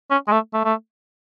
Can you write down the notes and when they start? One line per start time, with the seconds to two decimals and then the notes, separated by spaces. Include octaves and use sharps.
0.10 C#4
0.27 G#3
0.32 A3
0.54 A3
0.64 A3